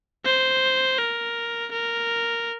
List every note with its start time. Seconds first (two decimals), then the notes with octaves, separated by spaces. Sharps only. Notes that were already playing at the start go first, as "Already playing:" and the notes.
0.25 C5
0.98 A#4
1.72 A#4